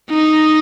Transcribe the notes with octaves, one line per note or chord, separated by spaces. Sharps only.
D#4